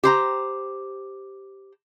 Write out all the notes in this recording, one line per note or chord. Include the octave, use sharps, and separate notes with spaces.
G4 C5 A#5